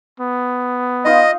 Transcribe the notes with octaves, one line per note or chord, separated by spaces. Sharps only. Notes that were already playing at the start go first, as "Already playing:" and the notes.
B3
D#4 F4 D#5 F5